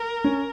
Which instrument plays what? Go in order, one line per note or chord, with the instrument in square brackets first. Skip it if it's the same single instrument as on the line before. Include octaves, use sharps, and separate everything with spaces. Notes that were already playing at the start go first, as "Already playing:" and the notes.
Already playing: [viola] A#4
[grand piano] C#4